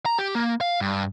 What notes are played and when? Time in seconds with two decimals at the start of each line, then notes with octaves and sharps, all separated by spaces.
0.06 A#5
0.19 G4
0.35 A#3
0.61 F5
0.81 G2